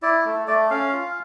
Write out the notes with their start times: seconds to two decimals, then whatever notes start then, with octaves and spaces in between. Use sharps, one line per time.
0.03 E4 D5
0.25 A3
0.47 A3 D5
0.70 C#4 F5
0.93 F4